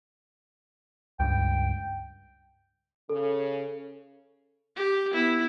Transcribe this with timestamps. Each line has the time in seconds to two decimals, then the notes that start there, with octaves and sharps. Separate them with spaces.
1.20 C#2 G2 G5
3.09 C#3 A4
4.76 G4
5.12 B3 E4